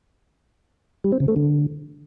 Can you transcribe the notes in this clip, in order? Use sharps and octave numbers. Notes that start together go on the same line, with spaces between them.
G3
C4
C#3
A3
D3